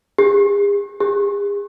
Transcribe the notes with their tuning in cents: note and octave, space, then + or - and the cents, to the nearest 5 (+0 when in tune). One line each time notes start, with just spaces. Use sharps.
G#4 -45
G#4 -45